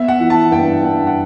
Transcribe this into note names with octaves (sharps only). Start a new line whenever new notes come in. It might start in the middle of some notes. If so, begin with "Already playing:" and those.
Already playing: B3 E5
F#5
E3
A5
G2 G5
G2 F#5
F#5